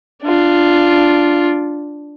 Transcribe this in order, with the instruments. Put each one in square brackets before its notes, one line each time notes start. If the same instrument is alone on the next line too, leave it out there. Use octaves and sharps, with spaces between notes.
[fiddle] D4 F4